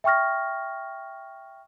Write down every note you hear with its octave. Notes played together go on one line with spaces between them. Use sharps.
E5 G5 C#6 F6 A#6